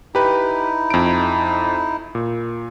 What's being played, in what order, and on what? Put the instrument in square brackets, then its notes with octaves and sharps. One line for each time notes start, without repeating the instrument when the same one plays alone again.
[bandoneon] D#4 E4 [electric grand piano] G4 B4
[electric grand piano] F2 D7
A#2